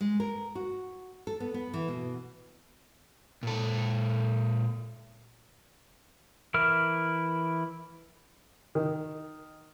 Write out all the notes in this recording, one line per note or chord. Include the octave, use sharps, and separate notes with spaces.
G#3
A#4
F#4
A4
B3
B3
E3
B2
A#2 A4
E3 E4 A#4 F6
D#3